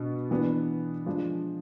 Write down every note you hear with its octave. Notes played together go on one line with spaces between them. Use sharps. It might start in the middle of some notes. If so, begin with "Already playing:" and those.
Already playing: B2 B3 D4
E3 B3 D4
F3 G#3 D4